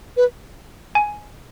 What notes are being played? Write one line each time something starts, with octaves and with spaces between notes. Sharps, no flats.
B4
G#5